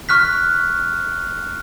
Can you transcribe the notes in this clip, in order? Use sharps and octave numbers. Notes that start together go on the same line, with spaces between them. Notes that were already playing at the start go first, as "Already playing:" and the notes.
C#6 F6 F#6 B6